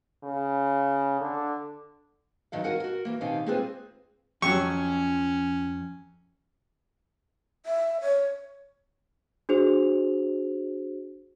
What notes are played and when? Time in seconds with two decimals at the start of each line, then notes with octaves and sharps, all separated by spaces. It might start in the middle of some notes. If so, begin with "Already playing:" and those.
0.24 C#3
1.21 D3
2.52 E2 G2 D#3 F#3 F5
2.64 F#4 A#4 F5 F#5 G#5
2.80 F#4 A#4
3.05 E3 A#3
3.21 B2 D#3 C4 G4 F5 G#5
3.46 A#3 C4 F4 G#4 B4 C5
4.42 F2 F#3 C#4 G4 C#6
7.66 E5
8.01 C#5
9.49 D4 F#4 G#4 C5 F7